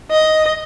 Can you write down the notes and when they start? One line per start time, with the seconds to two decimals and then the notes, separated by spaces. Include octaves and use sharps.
0.11 D#5